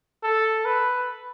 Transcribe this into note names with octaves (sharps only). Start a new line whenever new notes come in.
A4
B4